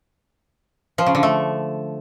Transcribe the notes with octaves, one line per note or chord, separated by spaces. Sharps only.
F3
C#3
D3
A3